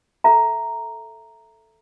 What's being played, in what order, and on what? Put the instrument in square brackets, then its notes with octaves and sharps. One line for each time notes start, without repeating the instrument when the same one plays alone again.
[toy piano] A4 E5 A#5